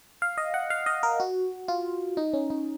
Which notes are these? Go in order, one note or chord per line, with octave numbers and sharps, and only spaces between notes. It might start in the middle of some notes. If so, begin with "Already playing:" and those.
F5
D#5
F#5
F5
D#5
A#4
F#4
F4
D#4
C#4
D#4